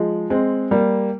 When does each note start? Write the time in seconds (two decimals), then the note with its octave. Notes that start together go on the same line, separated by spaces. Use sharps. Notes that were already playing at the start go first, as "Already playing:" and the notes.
Already playing: F3 G#3
0.30 G#3 C4
0.71 G3 A#3